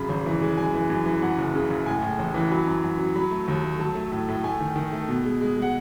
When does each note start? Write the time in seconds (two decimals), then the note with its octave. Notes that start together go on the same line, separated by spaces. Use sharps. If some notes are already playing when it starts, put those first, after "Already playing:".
Already playing: F#2 C#3 B5
0.09 G#1
0.26 E3
0.42 G#3
0.58 F#2 G#5
0.74 E3
0.90 F#2
1.06 E3
1.22 F#2 F#5
1.38 F#1
1.55 C#3
1.70 F#1
1.86 A2 G#5
2.02 A2
2.19 A1
2.34 E3
2.51 F#3 B5
2.67 F#2
2.83 F#2
2.99 F#3
3.16 F#3 B5
3.31 A3
3.48 D#2
3.64 A3
3.80 F#3 A5
3.95 A3
4.12 A2
4.28 A2
4.44 A3 G#5
4.60 D#3
4.76 D#3
4.92 A3
5.08 B2
5.25 G#3
5.41 G#3
5.57 G#3
5.62 F#5